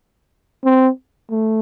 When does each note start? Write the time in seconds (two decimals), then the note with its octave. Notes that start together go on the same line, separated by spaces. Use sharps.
0.65 C4
1.31 A3